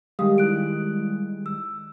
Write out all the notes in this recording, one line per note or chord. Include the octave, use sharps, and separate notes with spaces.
D#3 G3 G#3 G4 F5 D#6
E4 F#6 D7
E6